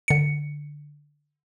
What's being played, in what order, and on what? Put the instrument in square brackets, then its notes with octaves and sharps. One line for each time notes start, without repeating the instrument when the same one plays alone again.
[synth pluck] D3 C#7